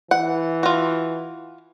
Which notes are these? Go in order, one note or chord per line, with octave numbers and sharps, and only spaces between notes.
E3 F#5
F4 F#4